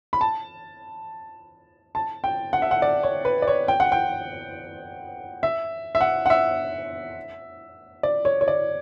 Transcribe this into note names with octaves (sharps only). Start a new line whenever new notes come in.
B5
A5
A5
G5
F#5
E5
F#5
D5
C#5
B4
D5
C#5
G5
F#5
G5
E5
E5
F#5
F#5
E5
D5
C#5
C#5
D5